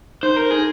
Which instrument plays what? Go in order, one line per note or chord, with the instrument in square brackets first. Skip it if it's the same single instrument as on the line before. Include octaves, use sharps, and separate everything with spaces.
[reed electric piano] D#4 [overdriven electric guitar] C5
[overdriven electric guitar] A#4
[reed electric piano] D#4 [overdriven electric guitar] G#4